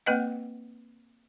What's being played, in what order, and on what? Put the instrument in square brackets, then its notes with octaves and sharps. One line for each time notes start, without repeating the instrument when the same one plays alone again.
[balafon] A#3 C4 B4 D#5 F#5